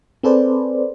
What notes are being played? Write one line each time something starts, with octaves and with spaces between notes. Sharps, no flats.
C4 G#4 A4 B4 C5 D5